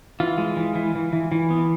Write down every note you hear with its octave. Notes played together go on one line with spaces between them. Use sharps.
E3 F4
G#3
E3
E3
E3
E3
E3
B3